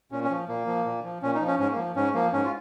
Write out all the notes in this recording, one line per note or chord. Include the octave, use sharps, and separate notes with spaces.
A#2 C#4
C#4
F3
A#2 A#3
F3
A#2
F3
A#2 C#4
D#4
F3
C#4
G#2 C#4
A#3
F3
G#2 C#4
F3 A#3
G#2 C#4
F4